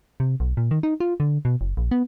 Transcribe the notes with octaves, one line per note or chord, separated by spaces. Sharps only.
C3
B1
A#2
D#3
D#4
F4
D3
B2
F#1
A#1
B3